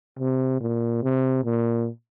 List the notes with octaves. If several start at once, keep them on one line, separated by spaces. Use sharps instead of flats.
C3
A#2
C3
A#2